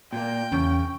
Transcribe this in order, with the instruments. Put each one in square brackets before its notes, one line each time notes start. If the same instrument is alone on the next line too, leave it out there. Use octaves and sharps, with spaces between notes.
[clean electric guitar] A#2 A#3 [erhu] G5
[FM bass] E2 [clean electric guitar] C#3 [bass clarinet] C#4